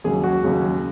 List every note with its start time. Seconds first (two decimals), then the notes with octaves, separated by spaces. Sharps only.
0.04 D#2 C#3 F#3 G#4
0.24 F#4
0.43 D#2 C#3 F#3